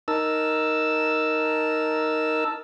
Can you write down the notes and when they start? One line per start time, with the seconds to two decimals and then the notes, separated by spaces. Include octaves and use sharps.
0.08 D#4 A#4 A5 E6